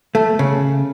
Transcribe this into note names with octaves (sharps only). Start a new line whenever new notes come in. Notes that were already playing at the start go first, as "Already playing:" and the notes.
A3
C#3